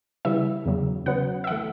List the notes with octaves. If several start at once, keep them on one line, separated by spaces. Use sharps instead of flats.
C#3 E3 G3 E5
E2 C#3 F#3
C#3 F#3 B3 F#5
E5
E3 A3 F#5